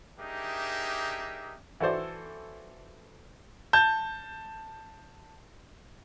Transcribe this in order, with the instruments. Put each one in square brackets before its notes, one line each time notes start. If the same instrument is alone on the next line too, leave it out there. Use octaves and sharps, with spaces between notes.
[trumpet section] D4 D#4 G4 G#4 A#4 E5
[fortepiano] E3 F#4 A4 C5 D5
[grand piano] A5 G6